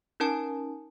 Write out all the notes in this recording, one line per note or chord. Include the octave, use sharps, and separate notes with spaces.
C#4 D#4 A#4 G#5 A5